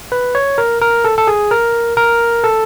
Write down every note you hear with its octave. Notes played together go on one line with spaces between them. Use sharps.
B4
C#5
A#4
A#4
A4
A4
G#4
A#4
A#4
A4